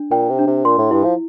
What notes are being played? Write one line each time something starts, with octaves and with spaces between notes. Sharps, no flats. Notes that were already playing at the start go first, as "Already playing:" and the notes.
Already playing: D4
A#2 G5
C3
D4
C3
A#2 C6
A2
G2 E4
F3